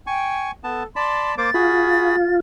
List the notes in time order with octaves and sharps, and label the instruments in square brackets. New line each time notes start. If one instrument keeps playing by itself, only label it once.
[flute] G5 [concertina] G#5 C#6
[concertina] B3 A5 [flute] A4
[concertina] D5 A5 B5 [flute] C6
[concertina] A#3 C5 D6 [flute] A6
[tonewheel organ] F4 [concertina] F#4 G#4 B5